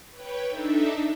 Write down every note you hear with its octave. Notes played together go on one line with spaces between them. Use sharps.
B4 C#5 G5
D4 D#4 A4 E5